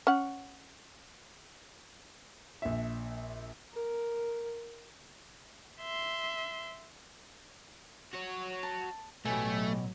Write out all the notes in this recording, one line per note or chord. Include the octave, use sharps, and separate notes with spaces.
C#4 F#5
A#1 E5
A#4
E5 C6
F#4 C#5
A5
A1 B2 F#3 A3 G4 G#5